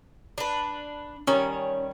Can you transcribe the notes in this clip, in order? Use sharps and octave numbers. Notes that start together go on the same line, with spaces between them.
D4 B4
D#3 G3 C#4 C#5